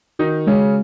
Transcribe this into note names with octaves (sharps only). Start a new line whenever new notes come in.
D#3 D#4 F#4
C#3 G#3 C#4